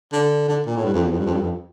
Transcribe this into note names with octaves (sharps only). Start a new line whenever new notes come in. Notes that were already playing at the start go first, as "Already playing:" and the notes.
D3
D3
A#2
A2
G2
F2
E2
F2
G2
F2
G2
F2